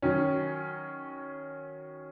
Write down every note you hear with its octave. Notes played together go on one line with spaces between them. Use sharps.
D#3 F#3 C#4